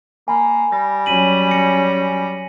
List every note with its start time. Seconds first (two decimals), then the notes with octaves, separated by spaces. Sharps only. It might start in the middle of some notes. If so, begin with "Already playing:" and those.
0.28 A#3 G#5 B5
0.72 G3 A#6
1.06 F#3 C#4 B6 D#7 F#7
1.51 A#6 C#7